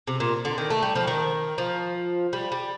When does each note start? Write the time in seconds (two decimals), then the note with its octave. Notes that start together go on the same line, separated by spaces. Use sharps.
0.07 C3
0.20 A#2
0.45 D3
0.58 D#3
0.70 A3
0.82 G3
0.95 F3
1.07 D#3
1.58 F3
2.33 G3
2.52 G3